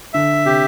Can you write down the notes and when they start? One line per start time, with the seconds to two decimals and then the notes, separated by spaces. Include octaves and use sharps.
0.14 D3 E5
0.46 C3 G4